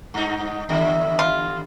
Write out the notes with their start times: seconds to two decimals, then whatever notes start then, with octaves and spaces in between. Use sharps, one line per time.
0.14 G2 D#4
0.69 D#2 D3 G3 E5
1.19 F4